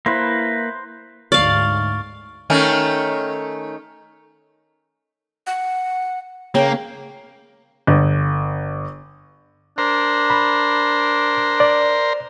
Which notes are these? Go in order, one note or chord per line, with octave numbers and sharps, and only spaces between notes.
A#3 E4 B4 C5
D2 G#2 D5 F5 C#6 F6 A6
D#3 A3 C#4
F#5
C#3 A#3 G5
G1
D4 A#4 C5
B5
D5